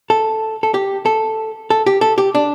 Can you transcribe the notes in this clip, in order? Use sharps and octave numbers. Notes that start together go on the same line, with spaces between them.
A4
A4
G4
A4
A4
G4
A4
G4
D4